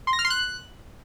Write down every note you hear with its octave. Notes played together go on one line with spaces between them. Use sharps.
C6
A#6
F6
C6
F#6